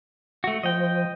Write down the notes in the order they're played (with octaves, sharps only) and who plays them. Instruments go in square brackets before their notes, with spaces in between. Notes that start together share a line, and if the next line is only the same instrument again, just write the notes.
[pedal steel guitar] A3 F#4
[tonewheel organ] F3 [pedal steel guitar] D#5 G5